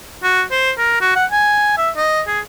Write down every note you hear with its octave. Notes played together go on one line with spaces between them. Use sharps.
F#4
C5
A#4
F#4
F#5
G#5
E5
D#5
G#4